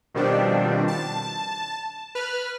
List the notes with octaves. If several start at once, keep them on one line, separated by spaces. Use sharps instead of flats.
B2 D#3 F3 G3 C4 D4
A5
B4 F6